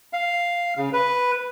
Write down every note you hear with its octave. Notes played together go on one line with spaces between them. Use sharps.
F5
C#3
B4